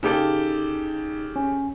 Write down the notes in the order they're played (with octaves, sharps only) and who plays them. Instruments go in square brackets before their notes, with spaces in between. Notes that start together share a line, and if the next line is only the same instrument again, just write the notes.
[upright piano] C#3 G4 A4 [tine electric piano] D#4
[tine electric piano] C#4